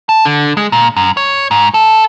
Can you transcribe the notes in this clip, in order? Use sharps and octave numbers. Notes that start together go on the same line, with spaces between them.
A5
D3
G#3
A#2
F#2
C#5
G#2
A4